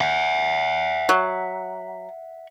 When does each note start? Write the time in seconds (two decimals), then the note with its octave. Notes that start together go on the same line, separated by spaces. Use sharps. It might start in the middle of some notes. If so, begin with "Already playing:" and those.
0.01 E5 F#5
1.09 F#3